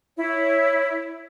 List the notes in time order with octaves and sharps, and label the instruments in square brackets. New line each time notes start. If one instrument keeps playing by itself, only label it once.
[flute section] E4 C#5